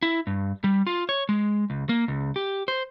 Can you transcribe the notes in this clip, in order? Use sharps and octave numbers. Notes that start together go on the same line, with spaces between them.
E4
G2
G3
F4
C#5
G#3
C#2
A#3
C#2
G4
C5